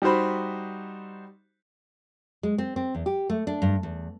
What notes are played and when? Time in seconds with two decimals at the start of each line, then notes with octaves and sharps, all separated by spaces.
0.02 G3 D#4 F#4 C5 B5
2.43 G#3
2.58 C4
2.76 C4
2.95 E2
3.06 G4
3.30 A3
3.47 D4
3.62 G2
3.83 E2